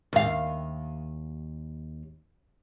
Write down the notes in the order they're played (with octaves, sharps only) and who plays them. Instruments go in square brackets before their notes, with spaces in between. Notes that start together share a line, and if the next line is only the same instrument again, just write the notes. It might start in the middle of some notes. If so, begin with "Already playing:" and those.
[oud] D#2 F5